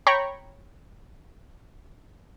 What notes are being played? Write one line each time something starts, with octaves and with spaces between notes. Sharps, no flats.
C#5 G5 A#5 B5 C#6